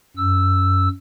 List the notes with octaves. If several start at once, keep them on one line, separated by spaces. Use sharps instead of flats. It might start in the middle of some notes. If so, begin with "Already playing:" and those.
F#2 E6